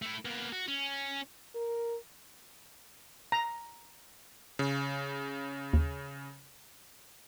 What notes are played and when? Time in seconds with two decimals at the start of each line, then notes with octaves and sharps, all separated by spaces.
0.02 A3 E4
0.25 A#3 B3
0.52 F#4
0.68 C#4
1.55 A#4
3.32 A#5
4.59 C#3
5.73 D#2